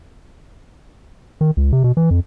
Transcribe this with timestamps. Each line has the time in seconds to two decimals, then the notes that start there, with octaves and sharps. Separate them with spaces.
1.41 D#3
1.57 C#2
1.73 C3
1.84 B2
1.97 E3
2.11 F2